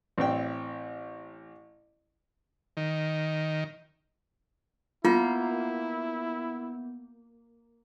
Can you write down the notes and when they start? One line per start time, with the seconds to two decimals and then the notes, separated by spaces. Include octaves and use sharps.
0.18 A1 C4 D5 G5
2.77 D#3
5.05 A#3 B3 E4 F4 G6